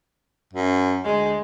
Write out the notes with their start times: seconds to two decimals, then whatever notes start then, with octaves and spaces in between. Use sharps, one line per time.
0.53 F#2
1.04 D2 G#3